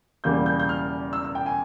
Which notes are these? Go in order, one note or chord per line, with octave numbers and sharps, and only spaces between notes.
E1 E2 C#3 G3 A#3 G6
G6
G6
F6
E6
E6
G5
G#5